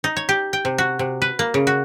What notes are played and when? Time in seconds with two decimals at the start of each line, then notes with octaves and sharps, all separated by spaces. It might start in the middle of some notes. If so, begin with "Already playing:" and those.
0.04 D#4
0.17 C#5
0.29 G4
0.53 G5
0.65 C3
0.78 F#4
0.99 C3
1.22 B4
1.39 A#3
1.54 C#3
1.67 F#4